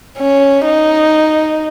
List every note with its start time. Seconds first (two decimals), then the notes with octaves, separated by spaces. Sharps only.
0.18 C#4
0.66 D#4